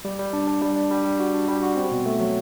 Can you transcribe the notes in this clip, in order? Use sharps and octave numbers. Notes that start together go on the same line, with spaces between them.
G3
G3
D4
D4
G3
D4
G3
G3
F#4
D4
G3
F#4
C4
B2
A3
F#3